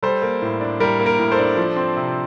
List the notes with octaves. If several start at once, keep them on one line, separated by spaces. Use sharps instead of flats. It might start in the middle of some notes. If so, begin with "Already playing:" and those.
G3 A4 C5
A#3
A2
D4
G3 A#4
A#3
A#4
A2
A4 C5
D4
F3
C4
C3